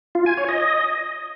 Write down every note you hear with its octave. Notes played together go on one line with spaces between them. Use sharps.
F4
G#5
C#5
D#5